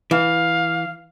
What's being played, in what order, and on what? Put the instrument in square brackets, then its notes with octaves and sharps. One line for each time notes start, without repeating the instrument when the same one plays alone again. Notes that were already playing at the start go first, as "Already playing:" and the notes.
[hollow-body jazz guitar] E3 [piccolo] F5